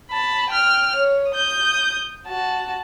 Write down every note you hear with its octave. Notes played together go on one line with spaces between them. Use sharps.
A5 B5
G5 F6
C#5
D#6 G6
F#4 A5